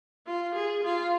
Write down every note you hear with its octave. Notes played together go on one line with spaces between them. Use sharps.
F4
G#4
F4